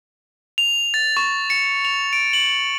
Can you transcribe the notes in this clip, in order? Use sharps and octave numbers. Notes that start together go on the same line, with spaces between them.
F7
A6
C#6
C#7
F7
D7
F#7